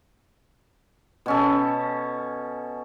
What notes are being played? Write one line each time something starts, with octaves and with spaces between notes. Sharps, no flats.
B2 C#4 A4